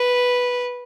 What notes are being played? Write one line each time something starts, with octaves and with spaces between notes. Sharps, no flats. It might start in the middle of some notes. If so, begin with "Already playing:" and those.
Already playing: B4